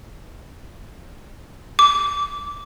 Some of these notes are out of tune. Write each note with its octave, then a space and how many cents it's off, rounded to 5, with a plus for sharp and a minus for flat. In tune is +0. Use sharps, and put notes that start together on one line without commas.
D6 -15